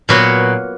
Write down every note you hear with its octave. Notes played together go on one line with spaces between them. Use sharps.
A#2 F#3 B3 F#4 B4